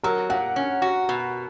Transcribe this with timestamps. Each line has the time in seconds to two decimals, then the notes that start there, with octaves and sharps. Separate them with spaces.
0.03 F#3 A#4
0.30 A#2 F#5
0.56 C#4
0.82 F#4
1.09 B2